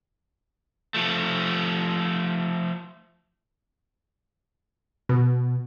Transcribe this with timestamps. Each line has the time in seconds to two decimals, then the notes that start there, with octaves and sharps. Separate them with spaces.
0.94 F3 A3
5.09 B2